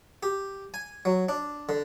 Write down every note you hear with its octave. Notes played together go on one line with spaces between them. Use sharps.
G4
G#5
F#3
D4
D3